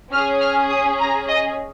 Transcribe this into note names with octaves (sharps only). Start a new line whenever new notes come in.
C#4 G#4 F6
F6
D#6
A#5
D#5